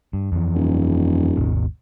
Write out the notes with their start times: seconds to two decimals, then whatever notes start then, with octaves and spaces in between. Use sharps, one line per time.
0.13 G2
0.32 F2 E3
0.54 D#1
1.37 G#1 D#2 B2